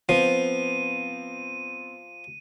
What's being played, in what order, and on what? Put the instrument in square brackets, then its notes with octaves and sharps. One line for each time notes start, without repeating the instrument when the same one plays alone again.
[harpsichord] F3 [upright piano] B3 C4 [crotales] D#7